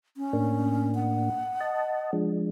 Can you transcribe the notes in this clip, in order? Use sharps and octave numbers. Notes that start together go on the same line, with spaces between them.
C#4
A2 A#3 D4
F#5
D#5 A5
F3 G#3 D4